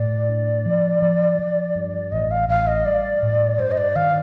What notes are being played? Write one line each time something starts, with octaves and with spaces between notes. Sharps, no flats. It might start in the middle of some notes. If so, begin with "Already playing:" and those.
Already playing: A2 D5
D4
F3
F3
F3
G2
A1 D#5
F5
A1 F5
D#5
G3 D5
A2
G2 C5
D#5
D5
D#3 F5